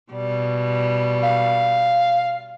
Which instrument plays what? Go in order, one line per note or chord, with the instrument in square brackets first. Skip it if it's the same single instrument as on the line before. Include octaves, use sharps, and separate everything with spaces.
[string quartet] B2 G3
[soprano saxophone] F5